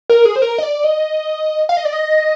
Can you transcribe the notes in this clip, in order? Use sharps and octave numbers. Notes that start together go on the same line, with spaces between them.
A#4
G#4
C5
A#4
D#5
D5
D#5
F5
D#5
D5
D#5